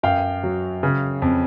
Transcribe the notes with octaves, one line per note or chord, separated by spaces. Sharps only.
F#2 F5 G5
F#3
C#3
F2